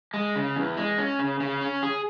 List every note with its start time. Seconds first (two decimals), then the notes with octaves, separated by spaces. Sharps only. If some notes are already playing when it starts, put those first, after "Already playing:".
0.14 G#3
0.36 C#3
0.56 E2
0.77 G#3
0.98 C#4
1.19 C#3
1.40 C#3
1.61 C#4
1.83 G#4